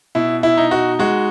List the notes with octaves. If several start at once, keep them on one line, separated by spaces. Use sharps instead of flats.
B2 E4
E4
D#4
F#4
G#3 F#4